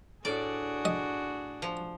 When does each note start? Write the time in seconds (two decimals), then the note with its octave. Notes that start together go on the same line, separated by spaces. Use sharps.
0.25 A2 D4 F#4 G#4 D5
0.85 D#5
1.62 F3